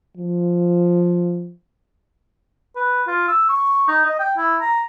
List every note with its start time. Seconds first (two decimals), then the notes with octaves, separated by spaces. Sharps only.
0.17 F3
2.76 B4
3.07 F4
3.28 E6
3.49 C#6
3.88 D#4
4.05 D#5
4.19 G5
4.38 E4
4.61 A#5